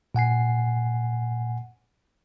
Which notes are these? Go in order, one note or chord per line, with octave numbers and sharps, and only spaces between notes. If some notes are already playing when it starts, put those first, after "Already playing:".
A#2 F#5 G#5 C7